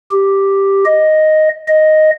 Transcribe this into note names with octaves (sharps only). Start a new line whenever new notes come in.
G4
D#5
D#5